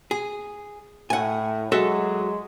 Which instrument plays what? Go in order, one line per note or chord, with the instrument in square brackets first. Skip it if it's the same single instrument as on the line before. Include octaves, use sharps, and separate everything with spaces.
[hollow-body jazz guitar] G#4
[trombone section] A2 [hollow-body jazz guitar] F#5 G#5
[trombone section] F#3 G#3 [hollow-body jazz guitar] F#4 A4 E5